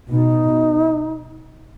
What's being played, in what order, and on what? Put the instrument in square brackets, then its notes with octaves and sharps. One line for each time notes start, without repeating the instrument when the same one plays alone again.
[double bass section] B2 [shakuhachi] D#4